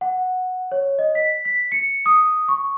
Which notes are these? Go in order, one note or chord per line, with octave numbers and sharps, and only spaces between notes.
F#5
C#5
D#5
B6
B6
C#7
D#6
C#6